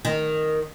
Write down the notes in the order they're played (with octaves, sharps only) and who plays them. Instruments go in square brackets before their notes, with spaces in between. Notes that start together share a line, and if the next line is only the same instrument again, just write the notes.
[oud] D#3